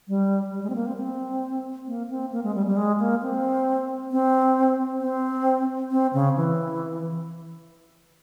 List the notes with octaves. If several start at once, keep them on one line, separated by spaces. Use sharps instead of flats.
G3
G3
G#3
C4
A#3
C4
C4
A#3
C4
A#3
G#3
G3
G3
G#3
A#3
C4
C4
C4
C4
C#3
E3